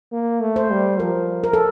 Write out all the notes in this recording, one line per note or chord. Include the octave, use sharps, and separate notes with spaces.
A#3
A3
C5
G3
F3 A#4
A#4
A4